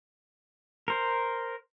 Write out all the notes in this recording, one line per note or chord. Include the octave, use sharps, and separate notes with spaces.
A#4 C5